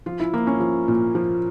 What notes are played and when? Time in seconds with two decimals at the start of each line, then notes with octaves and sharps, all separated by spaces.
0.06 F3 F4
0.20 E4
0.34 F3 A#3
0.47 C#4
0.60 F3
0.88 A#2
1.15 F3